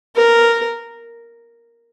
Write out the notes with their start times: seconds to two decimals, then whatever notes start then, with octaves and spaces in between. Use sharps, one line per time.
0.16 A#4